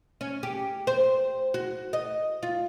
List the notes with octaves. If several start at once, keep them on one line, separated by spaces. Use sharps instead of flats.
C#4
G4
C5
F#4
D#5
F4